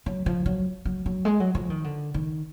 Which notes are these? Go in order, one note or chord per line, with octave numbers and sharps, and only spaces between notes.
F#3
F3
F#3
F#3
F#3
G#3
F#3
F3
D#3
D3
D#3